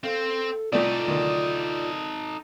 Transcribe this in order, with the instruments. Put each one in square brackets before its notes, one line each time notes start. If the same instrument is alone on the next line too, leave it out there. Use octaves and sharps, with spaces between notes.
[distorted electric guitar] C4 [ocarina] A4 [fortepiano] F5
[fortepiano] C2 A3 [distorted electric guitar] D#4 A4 [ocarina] F4 [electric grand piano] D5
[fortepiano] D2 D#3